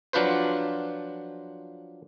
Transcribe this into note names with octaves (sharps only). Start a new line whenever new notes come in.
F3 F#3 D4 F4 B4 C5